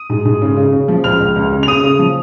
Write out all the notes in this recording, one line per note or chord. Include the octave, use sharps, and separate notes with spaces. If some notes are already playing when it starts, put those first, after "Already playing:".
Already playing: D#6 D#7
G#2
G#2
C#3
C#3
C#3
F3
C#2 F6 F7
C#2
C#2
C#3
F7
C#3 D#6 D#7
C#3
F3